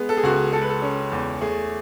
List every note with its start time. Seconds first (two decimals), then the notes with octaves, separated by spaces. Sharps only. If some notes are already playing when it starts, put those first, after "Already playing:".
Already playing: G#3 B3 G#4
0.09 A4
0.17 G#4
0.23 C#2 F#4
0.33 G#4
0.53 G#3 A4
0.61 B4
0.69 A4
0.82 C#4
1.12 E2
1.41 A3 G#4